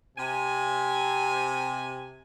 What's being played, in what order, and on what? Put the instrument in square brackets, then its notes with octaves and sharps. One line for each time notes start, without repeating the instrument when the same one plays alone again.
[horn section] C3 G#5